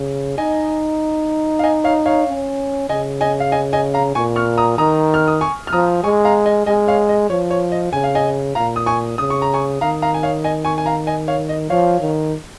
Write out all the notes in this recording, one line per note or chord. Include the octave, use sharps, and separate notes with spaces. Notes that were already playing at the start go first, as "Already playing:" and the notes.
Already playing: C#3
D#4 D#5 G#5
F5
D#5 G#5
C#5 F5
C#5 F5
C#4
C#3 D#5 G#5
D#5 G#5
F5
D#5 G#5
D#5 G#5
F5 A#5
A#2 G#5 C#6
C#6 F6
A#5 D#6
D#3 A#5 D#6
F6
D#6
G#5 C#6
F6
F3 A#5 D#6
G#3 G#5 C#6
F5 A#5
D#5 G#5
G#3 D#5 G#5
C#5 F5
D#5
F3 C#5
C#5
D#5
C#3 G#5
F5
D#5 G#5
A#2 F5 A#5
D#6
G#5 C#6
C#3 D#6
C#6
A#5
G#5 C#6
D#3 F5 A#5
F5 A#5
G#5
C#5 F5
D#5 G#5
G#5 C#6
G#5
F5 A#5
D#5 G#5
C#5 F5
D#5
F3 C#5 F5
D#3